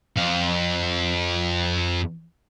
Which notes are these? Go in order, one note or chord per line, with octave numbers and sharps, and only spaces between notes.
F2 F5